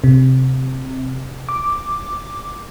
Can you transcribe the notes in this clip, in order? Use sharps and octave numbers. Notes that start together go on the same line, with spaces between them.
C3
D6